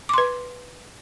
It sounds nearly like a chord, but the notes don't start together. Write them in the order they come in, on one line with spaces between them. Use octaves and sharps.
D6 C6 B4